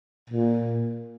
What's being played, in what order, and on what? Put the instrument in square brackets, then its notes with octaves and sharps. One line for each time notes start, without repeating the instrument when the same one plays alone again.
[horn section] A#2